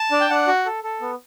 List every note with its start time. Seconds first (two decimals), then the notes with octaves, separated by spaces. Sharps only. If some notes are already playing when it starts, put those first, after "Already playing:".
Already playing: A5
0.11 D4
0.21 G5
0.30 D4 F#5
0.47 F#4
0.66 A4
0.84 A4
1.01 B3